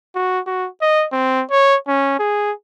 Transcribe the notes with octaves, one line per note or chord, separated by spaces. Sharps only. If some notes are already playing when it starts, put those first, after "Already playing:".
F#4
F#4
D#5
C4
C#5
C#4
G#4